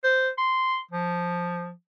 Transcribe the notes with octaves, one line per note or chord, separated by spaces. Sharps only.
C5
C6
F3